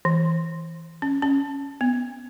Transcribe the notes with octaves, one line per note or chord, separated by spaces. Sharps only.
E3
C#4
C#4
B3